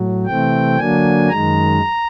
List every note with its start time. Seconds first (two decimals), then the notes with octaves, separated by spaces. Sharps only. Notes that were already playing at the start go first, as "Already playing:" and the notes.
Already playing: A2 F#3
0.26 C3 E3 A3 C4 G5
0.78 D3 F#3 A#3 D4 G#5
1.29 F#2 D#3 G#3 A#5